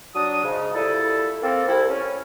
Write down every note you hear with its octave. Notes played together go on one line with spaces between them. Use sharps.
F#3 D4 D#6
G#2 C#3
A#2 G3 A3 E4 A4
A#3 C4 A4
C2 E4
C#4